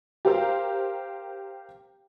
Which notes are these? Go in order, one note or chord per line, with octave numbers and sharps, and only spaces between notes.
G4 A#4 C5 F5